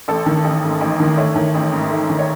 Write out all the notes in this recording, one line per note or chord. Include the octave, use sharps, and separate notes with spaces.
A1 A4
D#3
A1
G#2
A1
D#3
A3 C#5
D#3
A1
G#2
A3
D#3
C#5